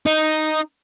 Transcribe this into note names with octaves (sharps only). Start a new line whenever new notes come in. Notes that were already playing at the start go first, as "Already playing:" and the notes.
D#4